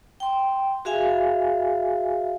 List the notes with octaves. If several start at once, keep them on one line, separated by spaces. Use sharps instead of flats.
G5 C6
F#4 G#4 E5 F5 G#5